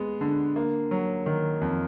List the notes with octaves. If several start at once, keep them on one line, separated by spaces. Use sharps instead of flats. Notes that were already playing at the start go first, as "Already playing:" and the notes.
Already playing: G#3 B3
D3
A#3
F#3
D#3
F2